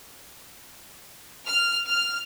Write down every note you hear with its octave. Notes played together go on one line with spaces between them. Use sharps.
F6
F6